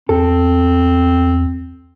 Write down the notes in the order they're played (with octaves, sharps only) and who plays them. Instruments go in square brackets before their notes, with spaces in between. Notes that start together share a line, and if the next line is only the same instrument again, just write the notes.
[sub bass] E2 [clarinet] C4 [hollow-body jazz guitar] A4